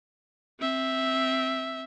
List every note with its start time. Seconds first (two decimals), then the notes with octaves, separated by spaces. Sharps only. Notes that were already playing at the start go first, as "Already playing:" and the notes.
0.60 C4 E5